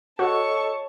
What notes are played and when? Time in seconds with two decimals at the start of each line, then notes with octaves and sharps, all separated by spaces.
0.19 F#4 A4 C#5 D#5 A5 C#6 E6